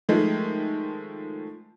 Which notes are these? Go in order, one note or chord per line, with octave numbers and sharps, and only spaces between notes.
D#3 F3 G#3 A3